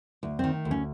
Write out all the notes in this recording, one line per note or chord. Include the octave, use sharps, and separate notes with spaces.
D2
D#3 C4
D2
C#4